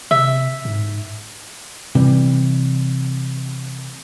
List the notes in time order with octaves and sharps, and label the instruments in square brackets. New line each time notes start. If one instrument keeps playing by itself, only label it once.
[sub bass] C3 [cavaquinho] E5
[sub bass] G#2
[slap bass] C3 E3 G3